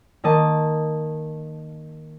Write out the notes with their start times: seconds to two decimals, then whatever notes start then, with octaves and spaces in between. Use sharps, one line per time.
0.24 D#3 A#3 D#5 A5